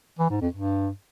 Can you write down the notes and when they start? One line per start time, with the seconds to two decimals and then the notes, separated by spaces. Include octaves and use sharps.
0.19 E3
0.30 G#2
0.41 F2
0.53 G2